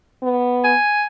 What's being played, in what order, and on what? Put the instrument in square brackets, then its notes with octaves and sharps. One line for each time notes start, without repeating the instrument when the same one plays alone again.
[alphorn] B3
[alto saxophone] G#5